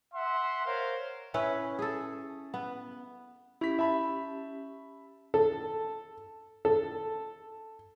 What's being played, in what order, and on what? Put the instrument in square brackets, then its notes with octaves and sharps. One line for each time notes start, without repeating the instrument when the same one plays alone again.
[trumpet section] E5 F#5 C6
A#4 C5 C#5 F5
[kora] C#4 E4 B4 C#5
G#4 A4
B3
[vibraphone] C#4 G4 [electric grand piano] E4 B6
[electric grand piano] E5 A5 B5
[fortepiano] A4
A4